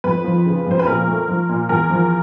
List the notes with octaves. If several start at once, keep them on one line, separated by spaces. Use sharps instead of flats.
F2 B4
F3
C#3
F2 C5
B4
A#2 A#4
A3
F3
A#2
E2 A#4
F3